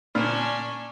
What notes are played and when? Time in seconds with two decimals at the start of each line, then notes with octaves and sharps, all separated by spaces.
0.15 A#2 C#4 D4